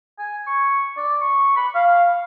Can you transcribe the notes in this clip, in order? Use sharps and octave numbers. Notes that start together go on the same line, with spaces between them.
G#5
C#6
D5
C#6
B5
F5